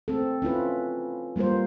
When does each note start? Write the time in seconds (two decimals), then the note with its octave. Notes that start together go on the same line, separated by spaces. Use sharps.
0.08 C4 A4
0.42 C#4 E4 F4 B4
1.36 G3 A#3 F4 A#4 C5